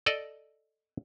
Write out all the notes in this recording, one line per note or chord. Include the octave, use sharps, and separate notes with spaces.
A4 D5 D#5